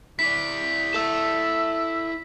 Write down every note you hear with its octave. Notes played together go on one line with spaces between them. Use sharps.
E4 D5 B6
A4 E5 E6